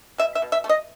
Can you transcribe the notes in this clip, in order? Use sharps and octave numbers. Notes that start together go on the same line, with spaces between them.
B2 E5
E5
B2
E5
A3
D#5